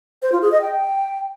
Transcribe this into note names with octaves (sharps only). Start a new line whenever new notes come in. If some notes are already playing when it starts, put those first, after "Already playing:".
C5
F4
G#4
D#5
G5